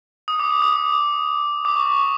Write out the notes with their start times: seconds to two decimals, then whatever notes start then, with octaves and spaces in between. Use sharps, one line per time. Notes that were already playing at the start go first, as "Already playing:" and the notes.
0.28 D#6
0.40 D6
0.51 D6
0.62 D#6
1.65 D6
1.76 C#6
1.86 D6